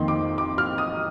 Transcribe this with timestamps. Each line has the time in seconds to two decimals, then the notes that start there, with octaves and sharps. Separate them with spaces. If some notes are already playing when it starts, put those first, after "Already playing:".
Already playing: F2 D#3 A#3 D#4 C6
0.08 D6
0.38 D6
0.58 F6
0.78 D#6